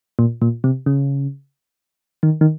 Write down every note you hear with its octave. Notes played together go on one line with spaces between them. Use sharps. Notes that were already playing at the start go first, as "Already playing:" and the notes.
A#2
A#2
C3
C#3
D#3
D#3